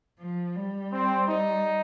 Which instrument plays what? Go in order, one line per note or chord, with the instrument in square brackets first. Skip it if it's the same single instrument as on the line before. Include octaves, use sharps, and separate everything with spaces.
[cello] F3
G3
[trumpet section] C4
D#4